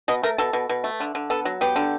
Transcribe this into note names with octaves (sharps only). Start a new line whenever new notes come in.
B2 D#5
A3 A#4
B2 A4
B2
B2
A3
D3
D3
B3 A4
F#3
B3 G4
D3